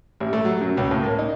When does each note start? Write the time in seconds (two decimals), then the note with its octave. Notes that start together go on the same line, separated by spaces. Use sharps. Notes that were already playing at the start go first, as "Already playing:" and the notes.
0.20 A1
0.33 A3
0.45 F#3
0.61 F#2
0.77 C#2
0.91 A2
1.03 A#3
1.19 D#4